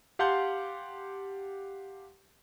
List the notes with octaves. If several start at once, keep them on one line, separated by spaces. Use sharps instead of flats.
G4 F5 F#5 A5 C6 G6